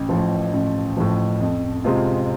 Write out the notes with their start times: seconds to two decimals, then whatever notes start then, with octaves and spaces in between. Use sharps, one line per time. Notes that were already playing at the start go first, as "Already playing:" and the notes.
Already playing: A1
0.09 A2 F3
0.53 A1
0.97 A2 F3
1.41 F2
1.84 C3 G#3 C4 F4